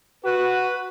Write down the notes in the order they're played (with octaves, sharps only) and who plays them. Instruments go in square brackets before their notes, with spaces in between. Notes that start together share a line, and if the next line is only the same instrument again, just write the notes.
[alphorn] F#4 [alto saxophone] B4